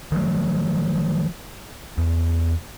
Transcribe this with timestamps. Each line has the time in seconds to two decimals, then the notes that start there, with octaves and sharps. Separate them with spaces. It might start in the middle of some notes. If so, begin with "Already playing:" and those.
0.12 D#3 F3 F#3 A3
1.98 E2